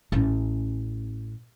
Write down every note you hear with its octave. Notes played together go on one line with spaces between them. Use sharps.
A1 C#4